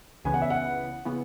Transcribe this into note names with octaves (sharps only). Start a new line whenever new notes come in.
C#2 C#3 E3 B3 G#5
F#5
E5
F#5
C#3 E3 B3